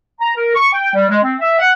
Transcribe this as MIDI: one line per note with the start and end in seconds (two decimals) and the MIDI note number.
0.21 0.32 82
0.36 0.52 70
0.55 0.72 85
0.73 0.92 79
0.94 1.04 55
1.10 1.18 56
1.23 1.35 60
1.40 1.57 76
1.59 1.73 78